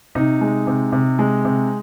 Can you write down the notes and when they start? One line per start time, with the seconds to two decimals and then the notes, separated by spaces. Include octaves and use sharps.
0.15 C3 D#4
0.41 G#3
0.67 C3
0.92 C3
1.19 G#3
1.45 C3